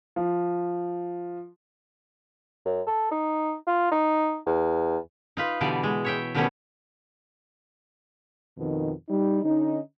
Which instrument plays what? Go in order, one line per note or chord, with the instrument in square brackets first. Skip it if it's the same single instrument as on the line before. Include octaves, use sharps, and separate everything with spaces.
[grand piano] F3
[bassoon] F#2
A4
D#4
F4
D#4
E2
[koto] D#4 F4 B4
B2 D3 E3 G3 D5
G#3
C#5 E5 G5
B2 D#3 G3 A3 B3 C#4
[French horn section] F2 B2 D#3
G3 D#4
D3 C#4 D#4